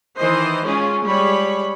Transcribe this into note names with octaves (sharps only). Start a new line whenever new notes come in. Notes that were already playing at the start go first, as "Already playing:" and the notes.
D#3 E3 C5 D#5
G#3 C#4 F4 G#4
G3 G#3 C#5 B5